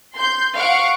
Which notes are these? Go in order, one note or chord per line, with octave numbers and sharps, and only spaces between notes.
C6 G6
F5 F#5 C#6 D7